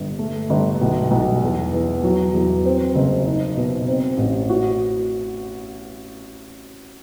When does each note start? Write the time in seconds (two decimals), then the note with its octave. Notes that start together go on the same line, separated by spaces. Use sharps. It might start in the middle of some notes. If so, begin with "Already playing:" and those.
Already playing: G1
0.19 A3
0.50 G1
0.81 B1
1.11 B1
1.42 E2
1.73 E2
2.03 F#3
2.34 E2
2.65 C4
2.95 F#1
3.26 D#4
3.57 B2
3.88 C4
4.18 A1
4.49 F#4